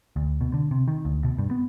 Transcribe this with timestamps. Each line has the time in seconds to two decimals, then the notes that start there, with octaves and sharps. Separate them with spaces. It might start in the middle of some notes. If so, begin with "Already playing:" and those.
0.16 D2
0.41 B2
0.54 D3
0.71 C3
0.88 D#3
1.05 D2
1.24 B2
1.38 G2
1.51 B3